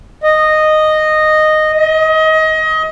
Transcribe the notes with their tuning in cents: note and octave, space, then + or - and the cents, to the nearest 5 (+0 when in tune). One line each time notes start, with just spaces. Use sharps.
D#5 -10
D#5 +25